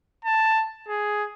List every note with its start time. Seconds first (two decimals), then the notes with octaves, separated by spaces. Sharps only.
0.25 A5
0.89 G#4